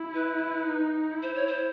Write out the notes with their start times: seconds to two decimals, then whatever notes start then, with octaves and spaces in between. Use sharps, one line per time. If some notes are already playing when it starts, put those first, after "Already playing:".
Already playing: E4
0.14 B4
0.63 D#4
1.11 E4
1.23 C5
1.35 C#5
1.47 C5